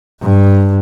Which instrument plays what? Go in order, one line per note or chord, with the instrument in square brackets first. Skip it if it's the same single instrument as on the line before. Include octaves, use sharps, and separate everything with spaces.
[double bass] G2